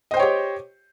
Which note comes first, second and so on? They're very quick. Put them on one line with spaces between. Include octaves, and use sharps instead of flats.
D#5 C5 G5 C#5 G4